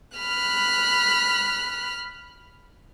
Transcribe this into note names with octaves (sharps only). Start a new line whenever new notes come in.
B5 F6 F#6